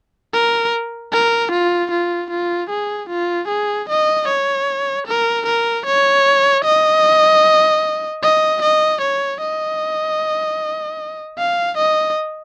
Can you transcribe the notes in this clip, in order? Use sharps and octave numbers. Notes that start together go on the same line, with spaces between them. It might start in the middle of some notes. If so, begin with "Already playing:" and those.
A#4
A#4
F4
F4
F4
G#4
F4
G#4
D#5
C#5
A#4
A#4
C#5
D#5
D#5
D#5
C#5
D#5
F5
D#5